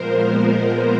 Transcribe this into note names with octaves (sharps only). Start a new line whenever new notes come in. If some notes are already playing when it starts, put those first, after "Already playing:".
Already playing: A#2 F3 G#3 B3 A#4 C5